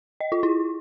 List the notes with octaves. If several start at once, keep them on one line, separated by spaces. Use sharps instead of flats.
D#5
F4
E4